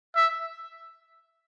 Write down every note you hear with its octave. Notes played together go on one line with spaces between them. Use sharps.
E5